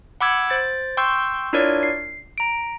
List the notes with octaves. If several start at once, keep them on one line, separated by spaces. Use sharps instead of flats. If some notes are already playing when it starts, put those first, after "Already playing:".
F#5 B5 D6 E6 G#6
C5 A6
G5 C6 C#6 E6 G6
D4 E4 F4 A#4 C#5 D5
C7
A#5 D7